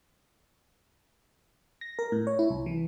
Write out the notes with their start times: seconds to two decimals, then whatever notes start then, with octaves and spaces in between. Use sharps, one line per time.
1.81 A#6
1.99 A#4
2.12 A2
2.27 C#5
2.39 E4
2.50 C2
2.66 E3